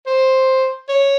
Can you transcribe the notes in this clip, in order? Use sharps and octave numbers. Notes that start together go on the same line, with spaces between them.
C5
C#5